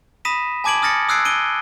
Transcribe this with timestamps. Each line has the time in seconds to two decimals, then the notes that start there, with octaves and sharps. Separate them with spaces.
0.25 B5 D#6 A#6 B6 D#7 E7
0.64 G#5 A5 D6 G#6 D7 F#7
0.82 D#6 F6 A6 A#6 C#7
1.09 D#6 E6 F#6 G#6 C7 D7
1.25 D7 D#7 G7